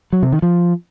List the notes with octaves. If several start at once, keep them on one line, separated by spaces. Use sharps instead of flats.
F#3
C3
D#3
F3